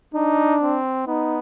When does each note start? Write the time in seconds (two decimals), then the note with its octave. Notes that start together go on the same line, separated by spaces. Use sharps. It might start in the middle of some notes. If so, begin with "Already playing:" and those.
0.14 D4 D#4
0.62 C4
1.07 B3 D#4